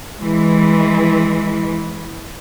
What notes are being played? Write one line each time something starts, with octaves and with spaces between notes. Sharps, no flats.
E3 G#3